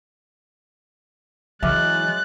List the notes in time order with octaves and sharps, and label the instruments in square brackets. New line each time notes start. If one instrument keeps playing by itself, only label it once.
[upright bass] E3 [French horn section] F#3 G#3 [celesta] E5 D6 F6 [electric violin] F#6 A6